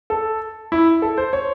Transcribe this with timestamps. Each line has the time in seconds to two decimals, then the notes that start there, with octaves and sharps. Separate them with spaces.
0.10 A4
0.72 E4
1.02 A4
1.18 C5
1.33 C#5